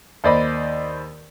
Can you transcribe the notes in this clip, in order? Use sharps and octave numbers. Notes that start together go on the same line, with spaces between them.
D#2 C5 D5 D#5 B5